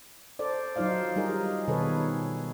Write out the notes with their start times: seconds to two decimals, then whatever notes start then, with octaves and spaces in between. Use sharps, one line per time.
0.39 A4 C5 D5
0.76 F#3 D#4 F4 C5 D5 F5
1.16 G3 D#4 G#4 A#4 D#5
1.68 B2 D#3 G#4 A4 B4 C#5